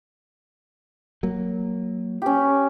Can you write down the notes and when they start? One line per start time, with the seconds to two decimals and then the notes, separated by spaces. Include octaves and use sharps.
1.23 F#3 A#3
2.22 C#4 G4